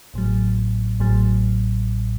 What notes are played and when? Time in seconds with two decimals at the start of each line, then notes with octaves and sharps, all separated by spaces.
0.14 A1 A2 F#3
1.00 A1 A2 F#3